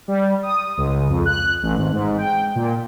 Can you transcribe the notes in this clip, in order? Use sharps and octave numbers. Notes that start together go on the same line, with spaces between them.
G3
D#6
C#2
F2
F#6
A1
G#1
G#2
G5
A#2